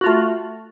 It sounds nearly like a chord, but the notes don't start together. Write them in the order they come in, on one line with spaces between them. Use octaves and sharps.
F#4 F4 A3